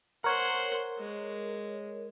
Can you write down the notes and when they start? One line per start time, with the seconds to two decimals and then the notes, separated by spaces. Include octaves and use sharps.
0.24 A#4 C5 C#5 F#5
0.98 G#3